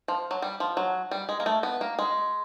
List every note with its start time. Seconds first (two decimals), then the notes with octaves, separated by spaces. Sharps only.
0.08 F3
0.31 F#3
0.42 G3
0.60 F3
0.77 F#3
1.11 G3
1.29 G#3
1.40 A#3
1.46 A3
1.63 B3
1.81 A#3
1.99 G#3